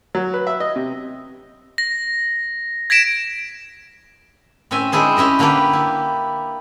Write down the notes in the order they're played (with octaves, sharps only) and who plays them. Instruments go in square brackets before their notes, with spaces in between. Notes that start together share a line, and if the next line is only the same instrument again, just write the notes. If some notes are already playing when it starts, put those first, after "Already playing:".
[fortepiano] F#3
B4
E5
D#5
C3
[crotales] A#6
G#6 A#6 B6 D7 E7
[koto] A2 C4 C#4 E5 G#5
G#3 D4 E4 G#4 C5
C#4 E4 G4 D#5
D3 A#3 D4 E4 G4 B4
E4